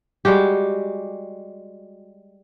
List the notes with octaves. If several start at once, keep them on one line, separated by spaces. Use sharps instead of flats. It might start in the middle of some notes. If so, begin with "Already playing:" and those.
G3 G#3 F#4 G4